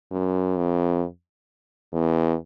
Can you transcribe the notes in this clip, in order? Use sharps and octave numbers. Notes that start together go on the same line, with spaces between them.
F#2
F2
E2